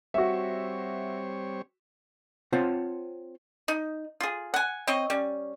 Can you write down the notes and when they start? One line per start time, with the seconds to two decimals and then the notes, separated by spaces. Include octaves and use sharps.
0.14 G3 C4 F#4 C#5 E5
2.52 C4 F4 C5 C#5 F#5 A5
3.68 D#4
4.20 F4 G#4
4.54 F#5 G#5
4.87 C4 C#5 D#5
5.10 G3 C#4